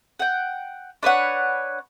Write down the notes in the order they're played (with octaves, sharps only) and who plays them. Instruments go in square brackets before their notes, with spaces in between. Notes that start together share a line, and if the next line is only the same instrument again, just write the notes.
[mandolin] F#5 G5
D4 B4 C#5 F#5